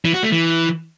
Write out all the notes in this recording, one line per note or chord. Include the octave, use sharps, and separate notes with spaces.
E3
F#4
A3
E3